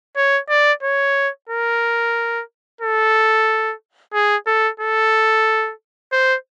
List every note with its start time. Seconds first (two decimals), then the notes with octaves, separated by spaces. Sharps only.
0.16 C#5
0.49 D5
0.83 C#5
1.49 A#4
2.81 A4
4.13 G#4
4.46 A4
4.80 A4
6.12 C5